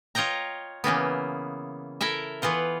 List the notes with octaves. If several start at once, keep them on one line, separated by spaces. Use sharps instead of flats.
F4 C#5 D#5 G5 A#5
C#3 E3 A#3 B3
E4 A4 A#4 E5
E3 B3 F4 F#5